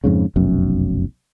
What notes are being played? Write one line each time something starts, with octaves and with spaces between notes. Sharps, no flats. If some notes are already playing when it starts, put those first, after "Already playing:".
F2 G#2 C#3
F1 B1 F#2